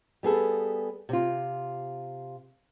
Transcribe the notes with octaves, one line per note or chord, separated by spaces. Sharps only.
G3 B3 G#4 A4
C3 F4